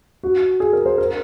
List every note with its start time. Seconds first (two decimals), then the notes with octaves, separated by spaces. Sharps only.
0.23 F#4
0.60 G#4
0.73 A#4
0.86 C5
0.98 A#4